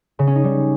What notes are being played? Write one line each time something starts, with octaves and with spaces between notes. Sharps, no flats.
C#3
C#4
D#4
G3